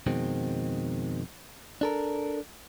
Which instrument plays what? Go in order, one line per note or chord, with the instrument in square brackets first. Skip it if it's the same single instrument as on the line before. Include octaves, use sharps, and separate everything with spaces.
[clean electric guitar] F2 B2 D#3 G#3 C4
D4 A4 A#4